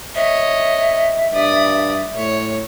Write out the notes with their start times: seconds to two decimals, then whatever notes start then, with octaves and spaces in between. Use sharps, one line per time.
0.15 C#5 D#5 E5
1.34 G2 D5 D#6
2.16 A2 C#5